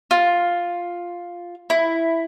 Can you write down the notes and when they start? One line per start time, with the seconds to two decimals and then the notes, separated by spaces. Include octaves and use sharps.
0.11 F4
1.70 E4